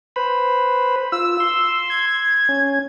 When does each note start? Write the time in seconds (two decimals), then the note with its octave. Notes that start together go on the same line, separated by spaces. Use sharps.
0.16 B4 C5 B5
1.12 F4 E6
1.40 C6
1.90 G#6
2.49 C#4